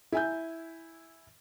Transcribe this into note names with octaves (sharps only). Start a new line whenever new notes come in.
E4 G#5 G6